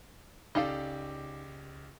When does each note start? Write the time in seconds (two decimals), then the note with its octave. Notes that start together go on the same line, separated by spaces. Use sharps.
0.55 C#2 D#4 G4 A4 D5 F5